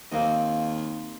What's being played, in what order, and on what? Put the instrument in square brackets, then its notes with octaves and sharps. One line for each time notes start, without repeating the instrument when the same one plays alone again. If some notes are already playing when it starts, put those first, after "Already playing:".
[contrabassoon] D#2 [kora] A#3 C4 D#5